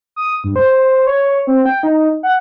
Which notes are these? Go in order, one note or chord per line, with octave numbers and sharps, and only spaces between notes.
D#6
G2
C5
C#5
C4
G5
D#4
F#5